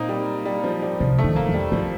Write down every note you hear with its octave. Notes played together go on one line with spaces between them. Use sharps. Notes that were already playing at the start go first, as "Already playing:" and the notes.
Already playing: A#2 A#3 C4 D#4
G3
G3
F3
G3
C3 F3
A3
D#3
A#3
F2
G3
G2 F3